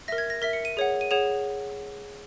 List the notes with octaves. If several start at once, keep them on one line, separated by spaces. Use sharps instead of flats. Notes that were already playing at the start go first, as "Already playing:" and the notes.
A#4 E5 A#6
G#6
A#6
A#4 E5 B6
C#7
D#7
G#4 C#5 F#5
D#7
G#4 C#5 F#5 E7